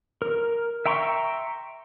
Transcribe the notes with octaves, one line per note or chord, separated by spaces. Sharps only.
A#4
E5 G5 A#5 C6 C#6